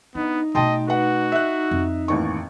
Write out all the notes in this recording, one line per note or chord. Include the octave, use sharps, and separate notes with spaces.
B3 D4 D#4
B2 A3 D#5 G5 A5 C6
F#4 B4 F#5
E5 F#6
F2
A1 D#2 C#6